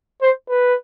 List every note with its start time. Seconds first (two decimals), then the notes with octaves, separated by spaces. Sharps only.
0.22 C5
0.49 B4